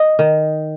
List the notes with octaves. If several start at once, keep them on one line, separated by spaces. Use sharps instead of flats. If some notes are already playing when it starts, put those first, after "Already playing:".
Already playing: D#5
D#3